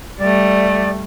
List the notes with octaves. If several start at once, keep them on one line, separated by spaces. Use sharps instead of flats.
G3 A3 D5